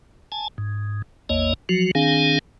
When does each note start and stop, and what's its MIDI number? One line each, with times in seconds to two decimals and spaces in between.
0.32 0.48 80
0.32 0.48 81
0.58 1.02 44
1.29 1.53 33
1.29 1.53 40
1.29 1.53 58
1.29 1.53 73
1.29 1.53 75
1.69 1.91 53
1.69 1.91 54
1.69 1.91 66
1.95 2.39 51
1.95 2.39 60
1.95 2.39 62
1.95 2.39 68
1.95 2.39 77
1.95 2.39 80